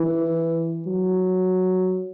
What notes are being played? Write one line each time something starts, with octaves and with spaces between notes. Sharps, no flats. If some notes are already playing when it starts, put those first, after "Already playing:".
Already playing: E3
F#3